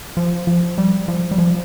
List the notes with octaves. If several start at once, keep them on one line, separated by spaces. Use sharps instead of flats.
F3
F3
G3
F3
G3
F3